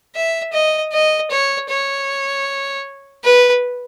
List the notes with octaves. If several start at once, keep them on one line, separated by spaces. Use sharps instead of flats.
E5
D#5
D#5
C#5
C#5
B4